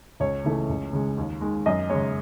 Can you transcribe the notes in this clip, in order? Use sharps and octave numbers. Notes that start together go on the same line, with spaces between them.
C#2 C#5
C#3 E3 A3
C#2
C#3 G#3
D#2
D#3 G#3
F#2 D#5
C#3 G#3 C#5